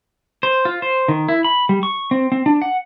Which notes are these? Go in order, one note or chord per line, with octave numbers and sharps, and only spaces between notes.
C5
F4
C5
D#3
E4
B5
G3
C#6
C4
C4
D4
F#5